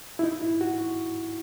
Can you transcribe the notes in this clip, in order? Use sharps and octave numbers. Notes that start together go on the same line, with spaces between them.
E4
D#4
E4
F#4